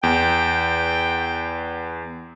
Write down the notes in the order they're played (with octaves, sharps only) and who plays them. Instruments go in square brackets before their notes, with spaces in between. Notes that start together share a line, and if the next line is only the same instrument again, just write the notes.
[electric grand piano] E2 [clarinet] G5